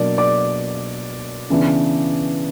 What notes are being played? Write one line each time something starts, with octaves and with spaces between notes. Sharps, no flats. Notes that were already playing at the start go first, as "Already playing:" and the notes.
Already playing: B2 F#3 A#3 D4 D5
D5 D6
C#3 E3 B3 D4